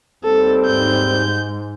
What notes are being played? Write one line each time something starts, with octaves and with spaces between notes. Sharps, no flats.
D#2 G3 C4 A4
G#2 G6